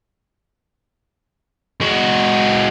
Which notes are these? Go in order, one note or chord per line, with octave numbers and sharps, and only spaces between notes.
G#3 F#4